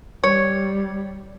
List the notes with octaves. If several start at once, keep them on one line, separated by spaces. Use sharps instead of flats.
G3 C#5